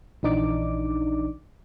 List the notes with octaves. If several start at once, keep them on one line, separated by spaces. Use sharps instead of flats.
A#1 E3 D4 D#4 D5 D6